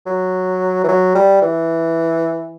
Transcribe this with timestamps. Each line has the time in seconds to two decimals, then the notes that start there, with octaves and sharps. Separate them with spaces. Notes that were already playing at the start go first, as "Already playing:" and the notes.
0.06 F#3
0.84 E3
0.88 F#3
1.15 G3
1.42 E3